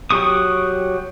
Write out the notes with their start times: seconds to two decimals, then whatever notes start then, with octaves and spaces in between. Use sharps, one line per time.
0.11 F#3 G4 C#6 D#6